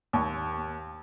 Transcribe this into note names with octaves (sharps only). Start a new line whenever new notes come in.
D#2